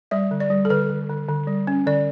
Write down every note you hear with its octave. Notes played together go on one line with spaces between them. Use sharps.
G3 E5
D3
D5
G3
A4
D3 B4
D3
D3
D3
G3
C#4
D3 D5